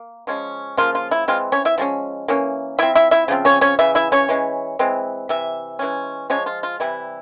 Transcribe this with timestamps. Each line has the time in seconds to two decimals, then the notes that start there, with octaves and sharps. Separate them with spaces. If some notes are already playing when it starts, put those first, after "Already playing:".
Already playing: A#3
0.27 F3 G#3 C#4
0.77 C#3 F3 A#3 F4
0.95 F4
1.11 E4
1.28 E3 G#3 C4 F4
1.52 C#4 C#5
1.65 E4 E5
1.78 F3 G#3 C#4
2.28 E3 A#3 C#4
2.79 F3 C4 E4 E5
2.95 E4 E5
3.11 E4 E5
3.28 C#3 F3 C4
3.45 C#4 C#5
3.61 C#4 C#5
3.79 C#3 E3 E5
3.95 E4 E5
4.12 C#4 C#5
4.29 E3 G#3 C#4
4.79 E3 G#3 C4
5.29 C3 E3 E5
5.79 E3 G#3 C#4
6.30 F3 G#3 C#4 C#5
6.46 F4
6.63 F4
6.80 C3 E3 G3 E4